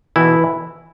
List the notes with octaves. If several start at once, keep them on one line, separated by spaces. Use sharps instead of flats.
B2 E3 E4